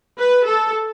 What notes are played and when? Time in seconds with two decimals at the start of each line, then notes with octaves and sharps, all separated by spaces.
0.18 B4
0.46 A4